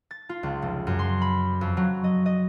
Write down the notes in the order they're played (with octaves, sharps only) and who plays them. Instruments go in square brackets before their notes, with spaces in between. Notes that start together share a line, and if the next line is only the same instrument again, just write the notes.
[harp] A6
F4
C#2
F1
F#2
C6
B5
F2
F#3
D#5
D#5